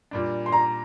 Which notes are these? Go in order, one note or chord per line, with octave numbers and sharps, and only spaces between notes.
A#2 G3 D4
C6
A#5